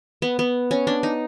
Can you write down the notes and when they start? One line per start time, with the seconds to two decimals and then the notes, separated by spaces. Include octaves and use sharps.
0.22 B3
0.39 B3
0.71 C#4
0.87 D4
1.03 D#4